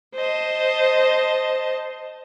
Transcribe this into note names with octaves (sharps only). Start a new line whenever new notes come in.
C5 D#5 A5